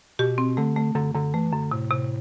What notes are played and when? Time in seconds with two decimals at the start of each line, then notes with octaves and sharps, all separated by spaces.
0.19 B2 G4
0.38 C4
0.57 D3 A3
0.76 A3
0.95 F#2 D3
1.14 F#2 D3
1.34 E3 A3
1.53 F#2 D3
1.71 A2 C3
1.91 C3